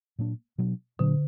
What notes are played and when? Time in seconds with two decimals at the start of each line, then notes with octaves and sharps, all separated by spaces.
0.19 A#2 F#3 A#3 D4
0.58 B2 F#3 D4
0.99 A#2 D3 F#3 D4